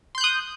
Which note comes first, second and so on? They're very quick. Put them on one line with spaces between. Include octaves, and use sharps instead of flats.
C6 G6 F#6 D#6